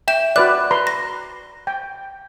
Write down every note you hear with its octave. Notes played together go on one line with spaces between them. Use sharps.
E5 G5 E7
F#4 B4 D5 F#6
B4 A#5 C6
A#6
G5